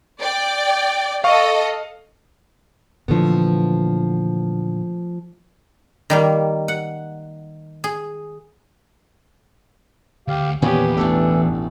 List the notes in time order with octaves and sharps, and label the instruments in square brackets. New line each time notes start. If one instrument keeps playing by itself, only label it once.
[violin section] D5 G5
[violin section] A4 D#5 [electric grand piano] F5 C#6
[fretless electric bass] A#2 D3 E3 [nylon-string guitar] F3 A3 B3
[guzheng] D#3 G3 A#3
F#5
G#4
[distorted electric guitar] D2 [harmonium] G4 F5
[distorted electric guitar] E2 [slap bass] A#2 D#3 [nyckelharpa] B3 G4 [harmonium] C#4 G#5
[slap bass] A1 B2 A3 [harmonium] E3 A4 [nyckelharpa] D4